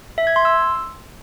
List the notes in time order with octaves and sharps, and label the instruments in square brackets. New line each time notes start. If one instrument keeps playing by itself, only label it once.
[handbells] E5
G#6
C6
E6